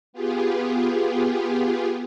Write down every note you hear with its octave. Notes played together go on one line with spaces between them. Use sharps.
B3 F4 G4 G#4